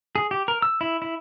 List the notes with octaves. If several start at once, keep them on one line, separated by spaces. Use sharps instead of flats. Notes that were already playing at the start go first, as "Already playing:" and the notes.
G#4
G4
A#4
E6
E4
E4